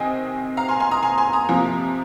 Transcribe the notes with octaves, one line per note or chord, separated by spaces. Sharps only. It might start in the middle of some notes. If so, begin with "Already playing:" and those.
Already playing: C3 D#3 C4 D#5 G#5
F5 A#5
G#5 C6
G#5 C6
A#5 D#6
G#5 C6
G#5 C6
A#5 D#6
C3 F3 A#3